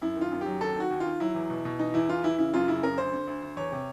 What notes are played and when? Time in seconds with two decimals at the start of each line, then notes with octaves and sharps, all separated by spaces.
0.02 F#2 E4
0.16 D#3 F4
0.32 F#2
0.41 F#3 G4
0.61 D#2 A4
0.76 D#3 F#4
0.91 D#2
1.00 F4
1.06 D#3
1.20 F#3 E4
1.35 E2
1.50 B2
1.65 B2
1.79 E3 D#4
1.94 E2 E4
2.09 E3 F4
2.24 E3 E4
2.38 C#3 E4
2.53 F#2 F4
2.68 C#3 E4
2.83 F#2 A#4
2.98 D2 C5
3.13 D3
3.27 D2
3.42 D2
3.57 E2 C#5
3.72 C3